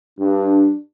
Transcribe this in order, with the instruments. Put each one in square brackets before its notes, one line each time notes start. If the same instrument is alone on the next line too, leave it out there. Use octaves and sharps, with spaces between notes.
[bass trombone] G2 [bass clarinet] D4